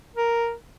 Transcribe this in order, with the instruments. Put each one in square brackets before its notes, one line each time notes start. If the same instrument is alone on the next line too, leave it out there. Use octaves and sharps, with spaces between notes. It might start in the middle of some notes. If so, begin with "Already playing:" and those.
[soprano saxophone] A#4